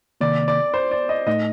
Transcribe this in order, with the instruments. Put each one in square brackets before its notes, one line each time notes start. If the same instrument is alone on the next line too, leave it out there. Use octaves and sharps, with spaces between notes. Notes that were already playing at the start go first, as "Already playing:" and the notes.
[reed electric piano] C3 D#3 A#3 [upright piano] D5
[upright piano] D5
C5
D5
D#5
[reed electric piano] A2 A3 D#4 [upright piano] D#5